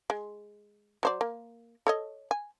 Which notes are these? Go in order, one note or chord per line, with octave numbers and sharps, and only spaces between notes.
G#3
F#3 C5 D5
A#3
A4 C#5 D#5
G#5